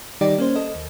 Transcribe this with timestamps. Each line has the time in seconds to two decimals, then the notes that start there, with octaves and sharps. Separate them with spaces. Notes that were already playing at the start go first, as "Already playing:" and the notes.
0.21 D#3 G3 D#4 G4 D5
0.38 A#3 C#4 C5
0.56 A4 D#5
0.75 D#2